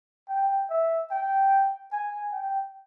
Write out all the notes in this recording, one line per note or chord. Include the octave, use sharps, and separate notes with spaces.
G5
E5
G5
G#5
G5